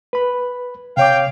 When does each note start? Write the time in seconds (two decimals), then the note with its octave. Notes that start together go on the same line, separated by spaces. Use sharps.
0.13 B4 B5
0.97 C3 C#5 F5 G5 D6